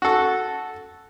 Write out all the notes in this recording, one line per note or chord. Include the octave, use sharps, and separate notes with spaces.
F#4 A4